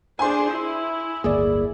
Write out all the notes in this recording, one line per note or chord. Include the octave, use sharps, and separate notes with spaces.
D4 G#4 C5 G#5 C6
E4
D1 G1 A#3 G#4 D5